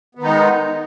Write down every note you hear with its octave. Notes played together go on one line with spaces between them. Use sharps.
D#3 G#3 B3 D#4